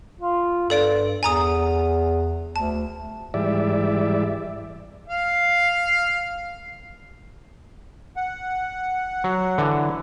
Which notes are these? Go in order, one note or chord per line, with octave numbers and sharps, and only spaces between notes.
F4
G2 A4 D5 D7
E2 G#5 A#5 D#6
D2 A5
G#2 E3 G3 D5 E5
F5
F#5
F#3
D3 E3